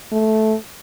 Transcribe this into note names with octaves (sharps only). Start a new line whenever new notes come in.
A3